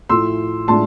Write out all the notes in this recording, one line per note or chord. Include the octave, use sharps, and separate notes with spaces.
A2 F3 A3 E4 C6 E6
A2 F3 G#3 D4 A5 C6